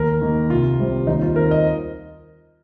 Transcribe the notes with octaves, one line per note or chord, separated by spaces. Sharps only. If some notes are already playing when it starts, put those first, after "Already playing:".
Already playing: D#2 A#4
D#3 A#3
C2 F4
C3 G3 C4
D#2 D#4
F4
D#3 C4 A#4
D#5